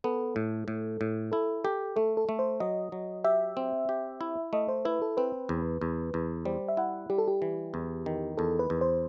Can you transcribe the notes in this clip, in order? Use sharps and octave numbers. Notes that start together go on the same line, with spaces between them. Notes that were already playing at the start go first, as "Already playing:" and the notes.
B3 A4
A2
A2
A2
E4 A4
G4 A4
A3 A4
A4
A3
C5
F#3 D#5
F#3
G4 E5
C4
G4
E4
A3 D#5
C5
E4 B4
A4
C4 B4
E2
E2
E2
G3 C5
E5
E4 F#5
G3 G4
A4
G4
E3
E2
D#3
E2 A4
B4
E2
C5